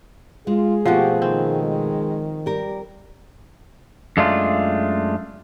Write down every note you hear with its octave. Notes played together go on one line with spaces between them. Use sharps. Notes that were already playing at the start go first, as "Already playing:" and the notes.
G#3 F4 G#4
B2 F3 A3 C4 F#4 G4
D#3 C4
G#3
G3 G4 A#4
F#2 G#3 A3 D4 F4